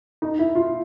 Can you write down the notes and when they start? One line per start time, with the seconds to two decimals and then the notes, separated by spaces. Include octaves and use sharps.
0.22 D#4
0.39 E4
0.55 F4